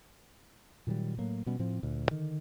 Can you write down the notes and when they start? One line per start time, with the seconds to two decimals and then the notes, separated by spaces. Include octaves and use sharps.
0.87 A#2 D#3 F#3 G3
1.18 A2 F#3 A#3
1.46 B2 G3 B3 C#4
1.59 A2 F3 C4
1.83 D2 A#2
2.11 D3 D#3